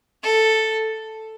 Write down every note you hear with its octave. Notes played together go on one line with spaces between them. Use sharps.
A4